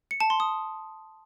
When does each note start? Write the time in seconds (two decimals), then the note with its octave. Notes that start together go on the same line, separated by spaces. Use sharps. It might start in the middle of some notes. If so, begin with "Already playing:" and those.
0.11 C#7
0.20 A5
0.30 C6
0.40 D#6